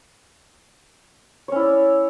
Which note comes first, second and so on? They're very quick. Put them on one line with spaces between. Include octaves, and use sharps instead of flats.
C#5 C#4 E4 D5